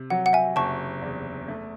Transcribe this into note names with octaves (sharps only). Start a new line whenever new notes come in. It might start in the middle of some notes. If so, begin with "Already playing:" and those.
Already playing: C3
F#3 F#5
F#5
E5 G#5
F#1 A5 C#6
E2
A3